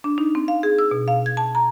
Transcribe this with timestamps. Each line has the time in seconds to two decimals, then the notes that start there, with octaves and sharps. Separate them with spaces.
0.04 D4
0.18 D#4
0.35 C4
0.48 F5
0.63 G#4
0.79 E6
0.91 B2
1.08 F5
1.26 G#6
1.37 A5
1.55 A#5